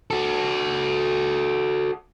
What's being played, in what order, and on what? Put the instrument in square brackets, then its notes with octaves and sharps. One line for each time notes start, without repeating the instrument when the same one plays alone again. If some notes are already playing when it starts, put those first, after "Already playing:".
[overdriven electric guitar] F#4 A4